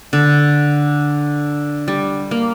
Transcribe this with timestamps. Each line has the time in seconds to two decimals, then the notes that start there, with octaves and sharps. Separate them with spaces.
0.13 D3
1.88 G3
2.31 A#3